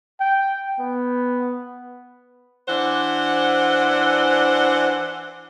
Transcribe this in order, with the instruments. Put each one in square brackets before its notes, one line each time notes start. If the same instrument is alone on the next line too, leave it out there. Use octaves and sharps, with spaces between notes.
[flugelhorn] G5
B3
[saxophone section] E3 D4 C5 F#5